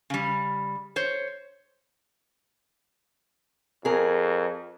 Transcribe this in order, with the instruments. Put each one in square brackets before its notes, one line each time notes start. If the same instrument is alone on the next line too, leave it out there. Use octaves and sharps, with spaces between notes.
[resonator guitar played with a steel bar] C#3 G3
C5 C#5
[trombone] F2 [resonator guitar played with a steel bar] G#4 A#4